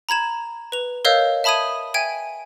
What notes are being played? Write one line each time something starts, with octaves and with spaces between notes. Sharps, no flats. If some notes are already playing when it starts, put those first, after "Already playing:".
A#5 B5 G#6 E7
B4 F7
A#4 C#5 D#5 F5 E6 G6
E5 A5 B5 D#6 G#6 D#7
E5 G5 G#5 G#6 D7 D#7